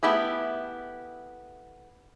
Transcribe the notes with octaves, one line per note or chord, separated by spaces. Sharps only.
A3 B3 E4 G4 G#4